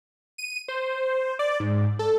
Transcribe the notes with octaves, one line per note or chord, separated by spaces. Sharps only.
D#7
C5
D5
G#2
A4